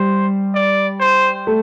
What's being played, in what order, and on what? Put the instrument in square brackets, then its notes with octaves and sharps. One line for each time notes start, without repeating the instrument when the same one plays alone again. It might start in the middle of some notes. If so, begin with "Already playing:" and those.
Already playing: [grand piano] G3 [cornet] C5
[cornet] D5
C5
[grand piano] A3